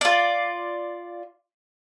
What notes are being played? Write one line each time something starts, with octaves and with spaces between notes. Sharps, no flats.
F4 D5